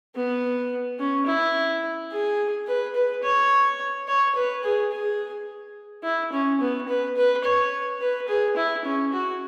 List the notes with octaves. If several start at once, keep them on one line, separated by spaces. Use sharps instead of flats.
B3
C#4
E4
G#4
B4
B4
C#5
C#5
B4
G#4
G#4
E4
C#4
B3
B4
B4
C#5
B4
G#4
E4
C#4
F#4